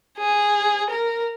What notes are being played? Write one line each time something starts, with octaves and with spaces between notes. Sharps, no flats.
G#4
A#4